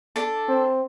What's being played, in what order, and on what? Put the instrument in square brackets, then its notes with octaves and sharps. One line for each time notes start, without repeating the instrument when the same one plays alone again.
[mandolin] D4 A4
[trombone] C4